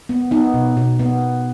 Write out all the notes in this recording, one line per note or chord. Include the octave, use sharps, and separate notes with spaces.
B3
B3 D#4
B2
B2
B3